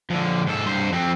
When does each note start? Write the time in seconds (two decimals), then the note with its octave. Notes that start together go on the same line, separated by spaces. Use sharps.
0.10 F2 D3
0.47 G#2 A4
0.66 G2 C5
0.92 F2 C4